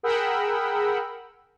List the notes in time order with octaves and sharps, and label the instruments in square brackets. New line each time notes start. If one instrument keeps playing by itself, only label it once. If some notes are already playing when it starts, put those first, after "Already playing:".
[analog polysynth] G#4 A#4 F#5 G5 B5 E6